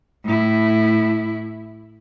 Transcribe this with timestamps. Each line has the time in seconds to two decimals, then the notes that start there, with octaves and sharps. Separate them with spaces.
0.24 A2 E4